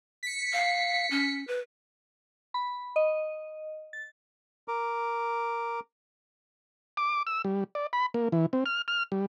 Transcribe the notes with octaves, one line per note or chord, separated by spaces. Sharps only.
B6 C#7
F5
C#4
B4
B5
D#5
A6
A#4 D6
D6
E6
G3
D5
B5
A#3
E3
C4
F6
F6
G3